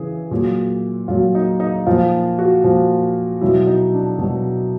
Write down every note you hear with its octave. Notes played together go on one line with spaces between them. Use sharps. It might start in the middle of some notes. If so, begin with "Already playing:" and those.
Already playing: C#3 E3 G#4
A#2 F#3
A#2 F#3 F4
D#4
D#4
A#2 F3 F4
F#4
A#2 F3
B2 F#3 E4
D#4
D4
B2 F#3